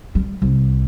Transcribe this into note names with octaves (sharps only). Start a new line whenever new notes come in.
G3
C2